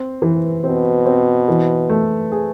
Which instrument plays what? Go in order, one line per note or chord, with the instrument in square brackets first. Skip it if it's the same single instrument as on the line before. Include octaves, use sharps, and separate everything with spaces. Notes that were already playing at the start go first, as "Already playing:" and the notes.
Already playing: [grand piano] C4
E3
[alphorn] B2 [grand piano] C4
[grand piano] C4
E3
A3
G#4